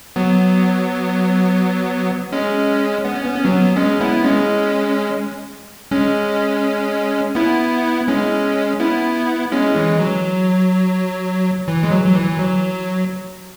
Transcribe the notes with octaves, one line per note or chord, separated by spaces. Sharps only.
F#3 B3
G#3 C#4
B3
C#4
B3
C#4
F#3 B3
G#3 C#4
B3 E4
G#3 C#4
G#3 C#4
B3 E4
G#3 C#4
B3 E4
G#3 C#4
E3 G#3
F#3
E3
G#3
F#3
F#3
E3
F#3